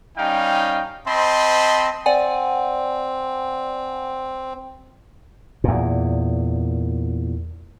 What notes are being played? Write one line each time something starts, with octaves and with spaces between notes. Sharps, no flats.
G3 C#4 D#4 F5 G5
C4 C5 D#5 A5 B5 C6
C4 D5 F#5 G#5
E2 A#2